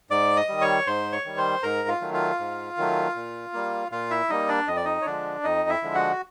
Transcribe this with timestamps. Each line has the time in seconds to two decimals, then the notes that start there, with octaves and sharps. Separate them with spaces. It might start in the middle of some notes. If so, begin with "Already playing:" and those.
0.10 G#2 D5 D6
0.37 D#5 D#6
0.49 D#3 G3
0.61 C#5 C#6
0.87 G#2 C5 C6
1.12 C#5 C#6
1.25 D#3 G3
1.37 C5 C6
1.63 G#2 A#4 A#5
1.88 F4 F5
2.01 D#3 F#3 A3
2.14 F4 F5
2.39 G#2
2.77 D#3 F#3 A3
3.15 A#2
3.53 G3 A#3
3.91 A#2 F4 F5
4.11 E4 E5
4.30 G3 A#3 D#4 D#5
4.48 D4 D5
4.67 F2 D#5
4.77 D5
4.85 D#4 D#5
5.02 C#5
5.06 D3 F3 G#3 D4 D5
5.44 F2 D#4 D#5
5.69 E4 E5
5.82 D3 F3 G#3
5.95 F#4 F#5